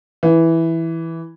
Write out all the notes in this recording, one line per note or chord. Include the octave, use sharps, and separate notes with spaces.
E3